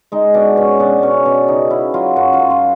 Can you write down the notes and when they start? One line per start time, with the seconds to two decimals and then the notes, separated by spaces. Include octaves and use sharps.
0.12 G#3 D#4
0.34 B2 D4
0.57 B2 C#4
0.79 B2 D4
1.03 B2 C#4
1.25 B2 D4
1.48 C#3 D#4
1.70 C#3 E4
1.94 F#3 F4
2.16 F#2 F#4
2.33 F4
2.39 F#2
2.50 F4